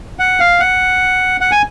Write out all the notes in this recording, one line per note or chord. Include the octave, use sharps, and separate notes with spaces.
F#5
F5
F#5
F#5
G#5